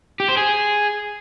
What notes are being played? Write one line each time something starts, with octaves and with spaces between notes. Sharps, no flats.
G4
C5
G#4